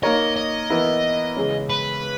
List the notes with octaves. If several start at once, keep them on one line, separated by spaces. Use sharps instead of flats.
A#3 D#4 A#4 C#5 D#5
D#5
E3 B3 E4 A#4
C#3 E3 G#3 C#4
B4